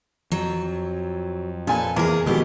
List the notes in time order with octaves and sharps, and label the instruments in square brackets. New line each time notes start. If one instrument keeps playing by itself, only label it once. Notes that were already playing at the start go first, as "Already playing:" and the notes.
[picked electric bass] F2 [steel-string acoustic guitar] F#3
[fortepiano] A#2 G#5 [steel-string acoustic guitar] A4 B4
[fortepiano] E2 [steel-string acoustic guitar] A#3 G#4
[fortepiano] B2 G#3 [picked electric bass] D#3 F3 [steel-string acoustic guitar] B3 G4